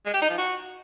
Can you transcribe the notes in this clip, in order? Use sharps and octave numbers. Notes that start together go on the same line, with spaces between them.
G#3
G4
D#4
F3
F#4